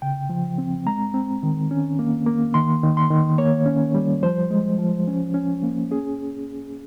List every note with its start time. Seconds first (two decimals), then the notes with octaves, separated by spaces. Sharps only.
0.02 C#3 G5
0.30 F3
0.58 C4
0.86 G#3 A#5
1.14 C4
1.43 D#3
1.71 C#4
1.99 A#3
2.27 A#3
2.54 D#3 C6
2.83 D#3
2.97 C6
3.10 D#3
3.38 A#3 C#5
3.66 C#4
3.95 G3
4.23 F3 C5
4.51 G#3
4.78 F3
5.07 C#4
5.34 C#4
5.63 A#3
5.91 C#4 G#4